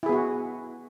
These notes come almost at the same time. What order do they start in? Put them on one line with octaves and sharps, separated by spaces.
E4 G#4 B3 F#4